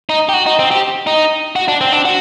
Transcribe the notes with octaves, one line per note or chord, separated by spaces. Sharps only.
D#4
G4
F#4
D#4
C4
G4
D#4
F#4
D4
C4
D4
F#4